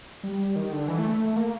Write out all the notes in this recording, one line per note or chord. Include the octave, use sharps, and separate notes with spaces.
G3
D#3
D3
E3
A3
A3
A3
A#3